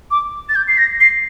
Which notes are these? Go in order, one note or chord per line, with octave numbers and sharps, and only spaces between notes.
D6
A6
G6
C7
A#6
C7